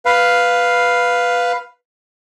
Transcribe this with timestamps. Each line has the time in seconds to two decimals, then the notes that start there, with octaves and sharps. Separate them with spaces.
0.05 B4 F5